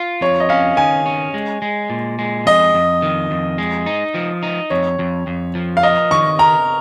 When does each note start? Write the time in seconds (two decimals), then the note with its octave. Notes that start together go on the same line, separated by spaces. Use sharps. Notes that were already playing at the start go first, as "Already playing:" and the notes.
Already playing: F4
0.21 F2 C#5
0.40 D#5
0.49 C#4 F5
0.77 D#3 G#5
1.06 C#4
1.34 G#3
1.62 G#3
1.90 A#2
2.19 G#3
2.46 F2 D#5
2.74 F2
3.02 D#3
3.31 F2
3.58 G#3
3.86 D#4
4.14 F3
4.43 D#4
4.70 F2 C#5
4.99 F2
5.27 F2
5.55 F3
5.77 F5
5.83 A#4 D#5
6.11 D#3 C#6
6.39 A#4 A#5